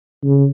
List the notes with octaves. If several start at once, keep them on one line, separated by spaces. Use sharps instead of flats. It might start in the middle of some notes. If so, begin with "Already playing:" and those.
C#3